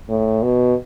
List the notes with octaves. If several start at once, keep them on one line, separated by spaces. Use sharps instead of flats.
A2
B2